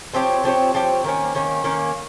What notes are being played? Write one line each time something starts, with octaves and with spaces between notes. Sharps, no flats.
F3 C4 G4 C#5
F3 C4 G4 C#5
F3 C4 G4 C#5
D#3 A#3 C#4
D#3 A#3 C#4
D#3 A#3 C#4